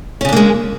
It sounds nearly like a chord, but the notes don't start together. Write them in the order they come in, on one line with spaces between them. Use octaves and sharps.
C#4 C#3 D4 A#3 G#3